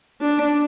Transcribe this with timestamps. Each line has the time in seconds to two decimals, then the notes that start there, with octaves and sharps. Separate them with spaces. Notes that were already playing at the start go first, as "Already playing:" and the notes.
0.21 D4